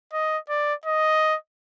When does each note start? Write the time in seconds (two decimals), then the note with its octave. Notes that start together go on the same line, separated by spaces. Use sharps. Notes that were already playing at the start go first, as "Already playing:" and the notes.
0.13 D#5
0.49 D5
0.86 D#5